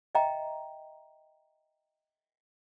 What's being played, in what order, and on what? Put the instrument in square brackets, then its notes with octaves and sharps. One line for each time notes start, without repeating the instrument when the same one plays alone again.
[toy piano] D#5 E5 G5 A#5